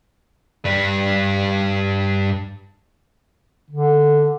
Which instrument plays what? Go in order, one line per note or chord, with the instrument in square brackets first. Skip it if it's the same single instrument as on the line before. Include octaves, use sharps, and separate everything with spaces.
[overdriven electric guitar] G2 G3
[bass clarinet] D3